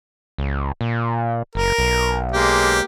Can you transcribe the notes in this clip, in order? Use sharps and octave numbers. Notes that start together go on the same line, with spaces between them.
C#2
A#2
F#1 A#4
B1
G#3 A#3 G4